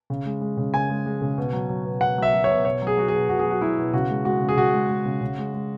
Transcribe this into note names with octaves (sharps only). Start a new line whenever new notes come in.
C#3
G#3
G#3
C#3
C#3 G#5
G#3
G#3
C#3
B2
F#3
F#3
B2
B2 F#5
F#3 E5
F#3
C#5
B2
B2 C#5
F#3
G#4
F#3 F#4
G#4
B2
B2 F#4
G#4
F#3 F#4
F#3 E4
B2
C#3 F#4
G#3
G#3 F#4
C#3
G#4
C#3 F#4
G#3
G#3
C#3
C#3
G#3
G#3